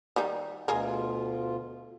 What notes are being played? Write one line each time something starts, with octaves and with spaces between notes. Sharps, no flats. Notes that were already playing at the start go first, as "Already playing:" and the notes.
D#3 G3 D#4
D2 B2 F4 G#4 A#4